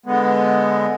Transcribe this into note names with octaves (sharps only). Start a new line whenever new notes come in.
D3 G#3 B3